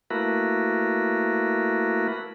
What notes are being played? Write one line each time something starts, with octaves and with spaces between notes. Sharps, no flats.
A3 A#3 E4 F#4 A#4 B4